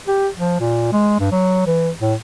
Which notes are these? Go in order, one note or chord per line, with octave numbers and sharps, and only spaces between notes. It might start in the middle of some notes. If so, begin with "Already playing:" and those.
G4
F3
A#2
G#3
G2
F#3
E3
A2